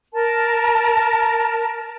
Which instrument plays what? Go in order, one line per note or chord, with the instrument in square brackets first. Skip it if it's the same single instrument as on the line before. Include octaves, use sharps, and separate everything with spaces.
[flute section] A#4 A5